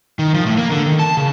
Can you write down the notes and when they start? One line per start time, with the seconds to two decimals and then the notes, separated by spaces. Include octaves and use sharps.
0.19 D#3
0.34 F3
0.46 A2
0.58 A#3
0.72 D3
0.86 D#3
0.99 A5
1.17 C#3